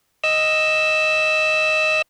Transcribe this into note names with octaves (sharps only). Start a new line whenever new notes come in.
D#5 E6